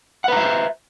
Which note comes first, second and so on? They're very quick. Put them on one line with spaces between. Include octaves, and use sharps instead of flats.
F#5 B4 A#5 E5 C5